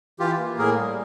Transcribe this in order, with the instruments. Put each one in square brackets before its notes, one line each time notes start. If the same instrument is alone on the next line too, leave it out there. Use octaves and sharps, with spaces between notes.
[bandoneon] E3 F4 G4
A#3
A2 G#4 A#4
G3